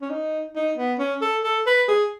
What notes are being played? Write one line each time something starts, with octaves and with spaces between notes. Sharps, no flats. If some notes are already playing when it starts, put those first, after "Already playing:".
C#4
D#4
D#4
B3
C#4
A4
A4
B4
G#4